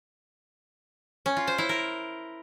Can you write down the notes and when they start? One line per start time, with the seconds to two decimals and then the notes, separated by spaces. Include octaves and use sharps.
1.26 C#4
1.37 F4
1.47 C5
1.58 E4
1.69 A#4